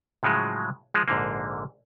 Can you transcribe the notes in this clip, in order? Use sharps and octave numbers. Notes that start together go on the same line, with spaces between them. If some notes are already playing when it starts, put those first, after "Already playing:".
A2 C#3 F3 F#3 G#3
F3 G#3
A#1 G#2 D3 A#3